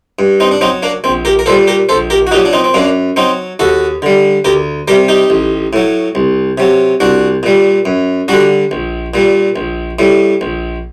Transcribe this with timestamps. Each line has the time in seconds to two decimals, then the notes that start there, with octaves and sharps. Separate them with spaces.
0.19 G2
0.40 C4 D#4
0.51 D4
0.61 F#3 C4 D#4
0.83 A#3 D4
1.04 A#1 C4
1.25 G4 A#4
1.39 A#4
1.46 A#2 G3 A4 C5
1.67 G4 A#4
1.89 A#1 A4 C5
2.10 G4 A#4
2.27 F#4
2.31 A#2 D#4 G4
2.36 F#3
2.45 D4
2.53 C4 D#4
2.64 C4
2.74 F#2 A#3 D4
3.16 F#3 C4 D#4
3.59 D#2 F#4 A4
4.02 D3 G3
4.45 D2 G4 A#4
4.88 G3 G4 A#4
4.91 C3
5.08 D#4 G4
5.30 A1
5.73 A2 F#3
6.15 C2
6.58 C3 F#3
7.00 C2 D4 F#4
7.43 A#2 G3
7.85 F#2
8.28 D3 G3 D4 F#4
8.71 A#1
9.14 A#2 G3
9.56 A#1
9.99 A2 G3
10.41 A#1